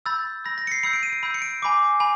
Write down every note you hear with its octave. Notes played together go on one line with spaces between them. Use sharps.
B5 E6 G6 A6
B5 E6 G6 A#6
A#6
C#7
C7
B5 E6 G6 C#7
D7
D#7
D7
B5 E6 G6 D#7
C#7
D7
G#5 B5 D6
G#5 B5